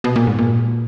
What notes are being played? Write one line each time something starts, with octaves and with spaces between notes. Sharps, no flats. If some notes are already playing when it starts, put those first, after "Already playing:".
B2
A#2
G#2
A#2